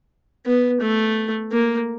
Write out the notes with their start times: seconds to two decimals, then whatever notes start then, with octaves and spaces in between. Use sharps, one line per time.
0.46 B3
0.81 A3
1.52 A#3